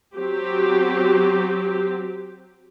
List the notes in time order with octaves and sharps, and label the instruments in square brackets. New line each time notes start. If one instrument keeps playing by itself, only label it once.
[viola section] F#3 C4 G4